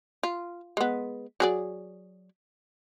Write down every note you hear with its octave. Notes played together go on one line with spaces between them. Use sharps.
F4
G#3 B3
F#3 G#4 D5